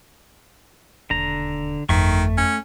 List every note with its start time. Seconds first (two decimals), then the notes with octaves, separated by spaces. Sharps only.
1.10 E1 D#2 D3 A#5
1.89 G1 F2 D#3 F3 A3 E5 C#6
2.38 C#4